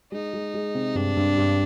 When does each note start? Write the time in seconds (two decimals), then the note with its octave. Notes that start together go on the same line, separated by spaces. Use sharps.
0.12 G#3 D#4
0.33 G#3
0.54 G#3
0.74 C3
0.95 G2 D4
1.17 G2
1.37 G2